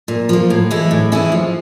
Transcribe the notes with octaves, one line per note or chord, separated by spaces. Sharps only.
A#2
F3 A#3
A2
E3 G#3 C#4 E4
A2
E3 G#3 C#4 E4
F3